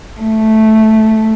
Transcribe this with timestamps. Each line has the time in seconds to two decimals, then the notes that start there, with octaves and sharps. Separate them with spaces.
0.20 A3